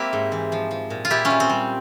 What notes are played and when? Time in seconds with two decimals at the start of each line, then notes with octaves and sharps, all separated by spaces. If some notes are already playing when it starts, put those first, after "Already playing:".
Already playing: A#3 C4 E4 G4
0.13 G#2
0.32 E3
0.52 F3
0.71 F3
0.90 A#2
1.05 F4
1.10 A#2 E4 G4
1.25 C#4 F4
1.30 G3
1.40 C4
1.49 G3